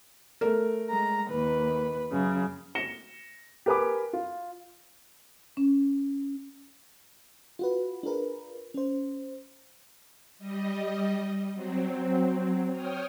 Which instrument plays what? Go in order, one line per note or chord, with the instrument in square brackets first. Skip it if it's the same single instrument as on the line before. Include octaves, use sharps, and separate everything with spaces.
[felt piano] A3 A#4
[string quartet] G#3 A#5
D#2 B4
F#2 C#3
[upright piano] A#6 C#7 E7 G7
G4 A#4 B4 G#5 B5 D6
F4
[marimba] C#4
[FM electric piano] F4 F#4 B4
D4 F4 G#4 A#4 B4
C#4 C5
[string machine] G3 D#5
F#3 C4
C#5 G5 D#6 F6